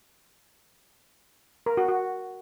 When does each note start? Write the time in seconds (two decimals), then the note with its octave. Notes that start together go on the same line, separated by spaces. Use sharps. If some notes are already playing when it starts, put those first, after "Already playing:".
1.66 A#4
1.77 F#4
1.88 F#4